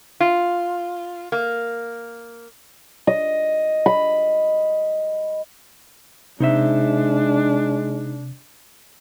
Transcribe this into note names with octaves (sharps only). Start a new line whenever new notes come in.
F4
A#3
D#5
B5
C3 G#3 D4 D#4 C5 E5